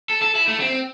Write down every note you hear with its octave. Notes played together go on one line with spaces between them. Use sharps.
A4
A4
E4
A3
C4